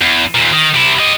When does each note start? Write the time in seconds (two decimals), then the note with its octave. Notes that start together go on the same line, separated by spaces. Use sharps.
0.01 E2
0.34 D#2 A#2
0.53 D#3
0.74 C3 E4
0.99 G4 D#5